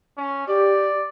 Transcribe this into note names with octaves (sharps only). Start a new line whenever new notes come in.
C#4
G4 D5